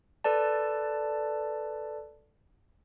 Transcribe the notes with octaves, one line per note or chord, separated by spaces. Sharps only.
A4 B4 D5 A5